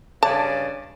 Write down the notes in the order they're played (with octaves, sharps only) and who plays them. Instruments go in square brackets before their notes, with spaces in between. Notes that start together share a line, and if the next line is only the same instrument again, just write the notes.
[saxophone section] G2 C#3 D5 [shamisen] A5